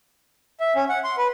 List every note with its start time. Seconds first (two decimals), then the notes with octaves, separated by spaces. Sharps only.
0.60 E5
0.76 C#4
0.89 F#5
1.04 C6
1.18 B4